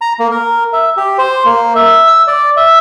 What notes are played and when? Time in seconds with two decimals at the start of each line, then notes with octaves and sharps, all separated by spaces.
0.01 A#5
0.20 A#3
0.31 A#4
0.73 E5
0.97 G4
1.18 C5
1.45 A#3
1.75 E5
2.08 E6
2.27 D5
2.57 E5